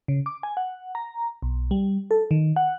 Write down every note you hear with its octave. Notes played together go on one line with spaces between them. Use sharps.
C#3
D6
G#5
F#5
A#5
B1
G3
A4
D#3
F#5